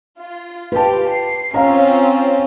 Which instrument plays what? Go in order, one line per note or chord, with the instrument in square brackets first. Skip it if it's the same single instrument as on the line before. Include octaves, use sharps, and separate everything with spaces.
[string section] F4
[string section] F4 G4 [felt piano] B4 A5
[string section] C7
[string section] C4 C#4 F4 [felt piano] F5 A#5